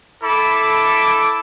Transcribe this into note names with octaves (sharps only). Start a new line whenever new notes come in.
E4 A4 B5 D6